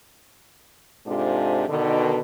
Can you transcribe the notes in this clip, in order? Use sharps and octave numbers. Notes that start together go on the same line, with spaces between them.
G#2 C3 G#3 D4 F4 A4
B2 D3 D#3